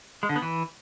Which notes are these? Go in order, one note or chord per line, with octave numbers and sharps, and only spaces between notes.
G#3
D3
B3
E3